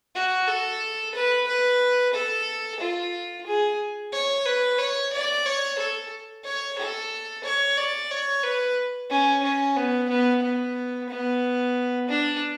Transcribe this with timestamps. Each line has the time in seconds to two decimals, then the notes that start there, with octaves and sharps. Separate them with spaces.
0.15 F#4
0.48 A4
1.15 B4
1.48 B4
2.14 A4
2.80 F4
3.47 G#4
4.13 C#5
4.46 B4
4.79 C#5
5.12 D5
5.46 C#5
5.79 A4
6.44 C#5
6.78 A4
7.44 C#5
7.78 D5
8.11 C#5
8.43 B4
9.10 C#4
9.43 C#4
9.76 B3
10.09 B3
10.43 B3
11.09 B3
12.09 D4